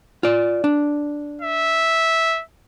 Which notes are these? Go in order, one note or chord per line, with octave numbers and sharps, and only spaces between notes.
F4 D5
D4
E5